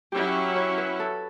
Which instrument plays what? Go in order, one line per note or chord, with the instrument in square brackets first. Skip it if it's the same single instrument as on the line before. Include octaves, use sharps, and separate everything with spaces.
[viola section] F#3 C#4 E4 [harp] G4
[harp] C#5
B4
A4